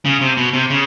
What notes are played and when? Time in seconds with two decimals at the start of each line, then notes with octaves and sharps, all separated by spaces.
0.05 C#3
0.21 C3
0.37 B2
0.54 C3
0.70 C#3